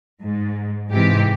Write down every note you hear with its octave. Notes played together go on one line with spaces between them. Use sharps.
G#2
G#2 C3 E3 G4